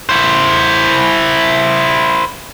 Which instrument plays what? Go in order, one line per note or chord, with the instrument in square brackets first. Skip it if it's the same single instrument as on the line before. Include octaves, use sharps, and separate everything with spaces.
[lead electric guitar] E4 C5